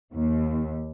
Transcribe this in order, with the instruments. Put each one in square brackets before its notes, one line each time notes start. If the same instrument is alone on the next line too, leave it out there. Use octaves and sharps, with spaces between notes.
[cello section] D#2